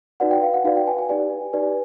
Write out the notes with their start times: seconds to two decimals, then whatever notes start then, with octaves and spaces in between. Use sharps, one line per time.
0.20 D#4 F#4 B4 D5 F#5
0.31 G5
0.42 F5
0.54 F#5
0.64 D#4 F#4 B4 D5 F5
0.76 G5
0.87 G#5
0.98 G#5
1.09 D#4 G4 B4 D5 G#5
1.53 D#4 G4 B4 D5